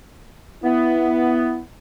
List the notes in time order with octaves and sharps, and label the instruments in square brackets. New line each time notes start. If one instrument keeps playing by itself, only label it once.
[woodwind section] B3 [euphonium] E4